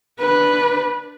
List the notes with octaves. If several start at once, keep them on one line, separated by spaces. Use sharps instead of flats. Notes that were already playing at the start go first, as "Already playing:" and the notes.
D4 B4